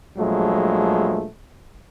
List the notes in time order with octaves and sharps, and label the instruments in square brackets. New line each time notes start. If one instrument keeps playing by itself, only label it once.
[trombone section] A#1 F3 F#3 G#3 A3